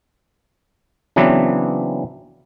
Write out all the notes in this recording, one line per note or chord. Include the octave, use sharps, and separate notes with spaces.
C#3 E3 F#3 B3 C4 D4